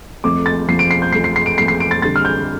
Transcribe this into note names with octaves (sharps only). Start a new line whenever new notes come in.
F2 F3 A3 D6
A6
F2 F3 A3 C7
D7
C7
G6
F2 F3 A3 C7
C7
C7
D7
F2 F3 A3 C7
C7
D7
A6
F2 D3 G3 A6
F6
G6